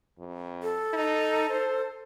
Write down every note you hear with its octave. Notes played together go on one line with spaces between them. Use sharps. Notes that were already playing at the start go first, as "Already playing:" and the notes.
F2
A4
D#4
C5